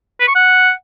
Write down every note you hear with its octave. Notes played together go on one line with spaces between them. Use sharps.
B4
C#6
F#5